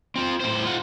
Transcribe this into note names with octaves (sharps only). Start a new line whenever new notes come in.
C4 F4
A2 C5
F4 F#5